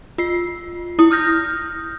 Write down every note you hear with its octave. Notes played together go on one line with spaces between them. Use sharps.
F4 C7
E4 D#6
D#6 F6 G6 A#6